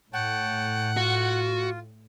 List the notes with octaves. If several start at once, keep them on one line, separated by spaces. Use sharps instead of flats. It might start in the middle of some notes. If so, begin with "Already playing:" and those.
A2 C#5 F#5 G5 A5
F4 F#4